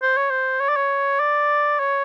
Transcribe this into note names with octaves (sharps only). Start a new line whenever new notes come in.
C5
C#5
C5
C#5
D5
C#5
D5
C#5